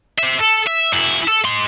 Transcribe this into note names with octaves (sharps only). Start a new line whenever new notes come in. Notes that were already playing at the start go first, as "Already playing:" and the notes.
C5 E5
A4
E5
F#2 E4
A4
D#4 C6